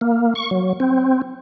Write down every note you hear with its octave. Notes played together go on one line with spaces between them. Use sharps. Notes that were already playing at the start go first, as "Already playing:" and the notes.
A#3
C#6
F#3
C4